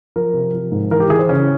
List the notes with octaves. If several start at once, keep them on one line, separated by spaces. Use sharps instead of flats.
F3 A#4
C3
F3
G#2
E3 A#4
G4
E3 G#4
C5
C#3 C#4